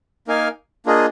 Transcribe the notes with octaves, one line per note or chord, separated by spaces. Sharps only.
A#3 D#4 A#4 F5 G#5
A#3 D4 F4 G#4 D#5